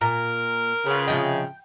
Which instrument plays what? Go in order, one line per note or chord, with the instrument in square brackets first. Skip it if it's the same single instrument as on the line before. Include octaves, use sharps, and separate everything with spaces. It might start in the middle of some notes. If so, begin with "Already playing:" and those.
[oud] A#2 [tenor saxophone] A#4 [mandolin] A#5
[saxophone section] C#3 [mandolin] F4 B4
[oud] C3 F3 D#5 [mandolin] G5